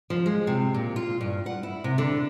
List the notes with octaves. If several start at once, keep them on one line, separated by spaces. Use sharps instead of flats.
F3
G#3
C3
A#2
F4
G2
F#5
E4
C3
D3